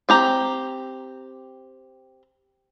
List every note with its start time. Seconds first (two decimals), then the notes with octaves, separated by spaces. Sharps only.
0.09 C4 G4 A#5